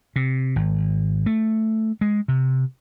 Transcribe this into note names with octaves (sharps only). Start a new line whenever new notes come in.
C3
G#1
A3
G#3
C3